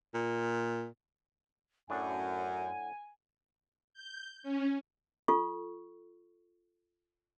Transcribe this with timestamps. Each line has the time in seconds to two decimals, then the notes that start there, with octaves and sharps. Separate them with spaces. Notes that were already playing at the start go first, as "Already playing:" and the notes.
0.14 A#2
1.90 F#2 A2 D4 F#5 G#5
3.94 G6
4.43 C#4
5.28 F4 A4 C#6